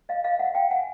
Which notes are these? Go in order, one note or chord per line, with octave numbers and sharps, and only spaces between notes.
D#5 F5
D#5 F5
E5 F#5
F5 G5
F#5 G#5